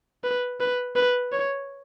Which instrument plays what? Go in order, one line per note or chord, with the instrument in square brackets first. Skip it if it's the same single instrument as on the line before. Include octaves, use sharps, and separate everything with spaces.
[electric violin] B4
B4
B4
C#5